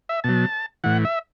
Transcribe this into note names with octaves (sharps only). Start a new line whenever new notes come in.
E5
B2 F#3 A5
A2 E3 F#5
E5